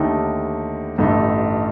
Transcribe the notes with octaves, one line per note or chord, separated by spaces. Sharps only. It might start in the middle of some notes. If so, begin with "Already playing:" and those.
Already playing: D#2 D3 A3 D#4 G4
A1 G2 D3 A3 D#4